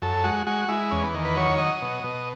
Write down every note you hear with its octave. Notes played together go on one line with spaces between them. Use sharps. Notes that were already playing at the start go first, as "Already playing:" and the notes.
F#2 A4
G#3 F#4
G#3 F#4
G#3 E4
E2 C#4
B3
D#3
B4
F#3 C#5
F#3 D#5
B2
B2